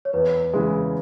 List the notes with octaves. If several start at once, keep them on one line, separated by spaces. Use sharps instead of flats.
C#5
E2 B4
C#3 E3 G#3